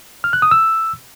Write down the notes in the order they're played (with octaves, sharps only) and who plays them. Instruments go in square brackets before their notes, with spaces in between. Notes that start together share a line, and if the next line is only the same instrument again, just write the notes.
[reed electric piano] F6
F#6
D#6
E6